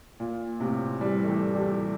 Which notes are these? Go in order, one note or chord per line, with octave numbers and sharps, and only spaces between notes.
A#2
A2 C3
E3 G3
A3
E3 G3
E3 G3